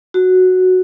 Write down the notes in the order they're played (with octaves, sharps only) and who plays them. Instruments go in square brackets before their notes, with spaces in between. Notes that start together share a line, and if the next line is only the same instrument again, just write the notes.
[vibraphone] F#4